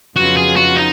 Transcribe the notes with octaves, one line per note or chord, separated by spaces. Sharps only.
F2 C#3 F#3 B3 F4 F#4
G#4
F#4
D#4